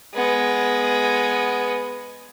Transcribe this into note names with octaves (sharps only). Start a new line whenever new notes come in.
G#3 B3